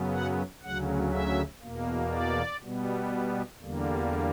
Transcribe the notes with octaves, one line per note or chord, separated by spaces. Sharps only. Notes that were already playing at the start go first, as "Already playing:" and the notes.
Already playing: F#2 C#3 F#3 B3
F#5
D2 C#3 F#3 F#5
E5
E2 B2 A#3
D5
B2 G3 B3
E2 D3 G3 A#3